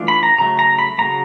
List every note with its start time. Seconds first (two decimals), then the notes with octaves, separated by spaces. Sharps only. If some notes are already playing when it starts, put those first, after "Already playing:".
Already playing: E3 A3 D4 F4
0.08 B5
0.23 A#5
0.38 C#3 F#3 A3 A#5
0.59 A#5
0.79 B5
0.98 C#3 F#3 A3 A#5